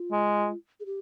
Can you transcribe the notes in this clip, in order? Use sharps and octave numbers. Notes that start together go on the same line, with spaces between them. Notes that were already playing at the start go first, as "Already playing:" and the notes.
Already playing: F4
G#3
G#4
G4